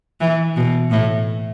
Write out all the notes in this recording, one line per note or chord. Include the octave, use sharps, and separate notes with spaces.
E3
B2
A2